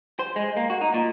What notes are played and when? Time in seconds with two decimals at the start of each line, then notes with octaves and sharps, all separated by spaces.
0.19 C5
0.36 G#3
0.57 A#3
0.70 F#4
0.81 D#4
0.94 A#2